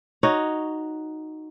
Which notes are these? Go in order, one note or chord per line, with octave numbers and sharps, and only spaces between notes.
D#4 F#4 C#5